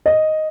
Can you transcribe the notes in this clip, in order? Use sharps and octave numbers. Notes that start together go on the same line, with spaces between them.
D#5